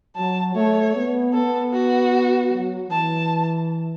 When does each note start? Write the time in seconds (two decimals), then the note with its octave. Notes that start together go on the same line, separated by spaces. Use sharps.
0.16 F#3 A5
0.55 A3 C#5
0.95 B3
1.34 B3 A4
1.73 F#4
2.51 F#3
2.90 E3 A5